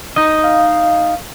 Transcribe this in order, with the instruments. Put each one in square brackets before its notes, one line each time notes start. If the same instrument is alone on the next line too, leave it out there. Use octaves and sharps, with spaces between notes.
[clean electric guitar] D#4 D#5
[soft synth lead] F5